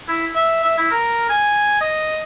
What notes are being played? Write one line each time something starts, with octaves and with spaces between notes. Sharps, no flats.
E4
E5
E5
E4
A#4
G#5
D#5